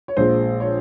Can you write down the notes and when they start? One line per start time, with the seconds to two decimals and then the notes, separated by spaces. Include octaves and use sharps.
0.08 C#5
0.17 A#1 A#2 G#3 C5
0.60 C#5